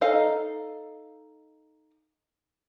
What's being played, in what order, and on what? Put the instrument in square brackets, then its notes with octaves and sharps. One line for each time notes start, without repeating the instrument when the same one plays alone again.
[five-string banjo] D#4 A4 D#5 F5 A#5